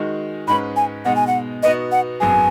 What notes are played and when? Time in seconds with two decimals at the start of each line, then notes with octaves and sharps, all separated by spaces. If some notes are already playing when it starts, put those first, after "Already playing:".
Already playing: D#3 G#3 D#4 F#4
0.47 G#2 G#3 C#4 B4 B5
0.76 G#5
1.05 B2 G#3 D#4 F#5
1.16 G#5
1.27 F#5
1.63 B2 B3 D#4 F#4 D#5
1.92 F#5
2.20 G#1 F#2 F#3 B3 G#4 G#5